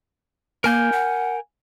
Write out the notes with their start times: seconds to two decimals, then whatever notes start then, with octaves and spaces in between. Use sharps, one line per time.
0.64 A#3 A#4 G#5 G6
0.92 F#5